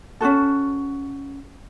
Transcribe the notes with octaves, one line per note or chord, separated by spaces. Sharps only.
C#4 D4 F#4 A4